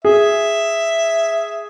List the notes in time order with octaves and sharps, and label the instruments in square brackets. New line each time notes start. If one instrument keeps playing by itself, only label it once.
[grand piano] G#4 [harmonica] E5